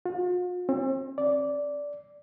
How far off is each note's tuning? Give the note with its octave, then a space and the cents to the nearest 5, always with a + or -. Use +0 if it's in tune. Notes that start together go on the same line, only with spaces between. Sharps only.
F4 +45
C4 +45
D5 -10